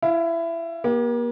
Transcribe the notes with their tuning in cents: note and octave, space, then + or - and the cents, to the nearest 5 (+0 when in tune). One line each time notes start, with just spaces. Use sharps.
E4 +20 F5 +0
A#3 +40 G4 +0